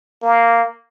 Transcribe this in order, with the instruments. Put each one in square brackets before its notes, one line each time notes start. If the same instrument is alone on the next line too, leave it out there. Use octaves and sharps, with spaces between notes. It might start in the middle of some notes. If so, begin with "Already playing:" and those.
[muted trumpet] A#3